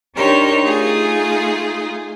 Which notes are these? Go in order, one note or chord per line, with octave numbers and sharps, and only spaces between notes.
D4 D#4 G4 A#4 C5 C#5
A3 D#4 F4 G#4